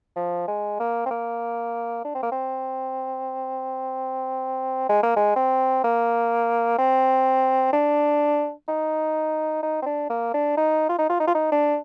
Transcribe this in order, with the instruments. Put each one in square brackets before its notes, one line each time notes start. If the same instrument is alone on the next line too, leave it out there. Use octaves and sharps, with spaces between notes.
[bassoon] F3
G#3
A#3
C4
A#3
D4
C4
A#3
C4
G#3
A#3
G#3
C4
A#3
C4
D4
D#4
D#4
C4
D4
A#3
D4
D#4
F4
D#4
F4
D#4
F4
D#4
D4